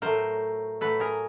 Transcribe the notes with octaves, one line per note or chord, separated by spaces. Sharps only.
A2 F#3 A3 A#4 C5
A2 F#3 A3 A4 B4
G#4 A#4